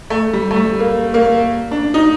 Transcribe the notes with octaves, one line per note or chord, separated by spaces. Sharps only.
A3
G3
A3
G3
A#3
A#3
D4
D#4